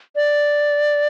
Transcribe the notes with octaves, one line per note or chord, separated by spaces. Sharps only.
D5